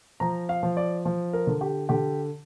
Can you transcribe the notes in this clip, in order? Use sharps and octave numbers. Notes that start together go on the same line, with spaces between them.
F3 A#5
F5
F3
D5
F3
A#4
D3
G4
D3 G4